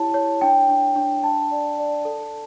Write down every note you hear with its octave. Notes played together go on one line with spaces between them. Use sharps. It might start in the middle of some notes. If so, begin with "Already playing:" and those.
Already playing: E4 G4 C#5 A5
C#5
D4 G5
D4
D4
D4 A5
D5
D5
A4